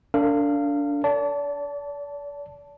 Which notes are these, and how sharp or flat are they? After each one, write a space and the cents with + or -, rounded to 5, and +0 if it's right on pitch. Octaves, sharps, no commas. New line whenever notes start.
D4 -25 A4 +45 F5 -15
D5 -40 A5 +0